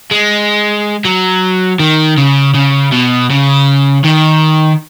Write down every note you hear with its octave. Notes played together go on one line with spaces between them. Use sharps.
G#3
F#3
D#3
C#3
C#3
B2
C#3
D#3